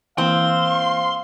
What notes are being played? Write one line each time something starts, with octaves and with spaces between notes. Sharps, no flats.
E3 A#3 C4 F5 C6